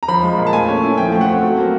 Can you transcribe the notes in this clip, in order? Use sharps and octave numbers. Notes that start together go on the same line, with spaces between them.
A#5
F3 B5
G#3
A#2
A5
A3 G#5
C#4
E4
F3 G5
A3
F#5
C4
F#3
A#3